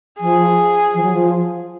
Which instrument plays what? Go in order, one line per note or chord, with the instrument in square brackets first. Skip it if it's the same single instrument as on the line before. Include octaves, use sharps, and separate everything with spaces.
[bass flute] F3 [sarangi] G#4
[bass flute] F3
F#3
F3